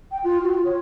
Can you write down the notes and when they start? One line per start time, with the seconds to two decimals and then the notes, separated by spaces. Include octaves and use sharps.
0.11 G5
0.24 F4
0.43 F#4
0.65 C#5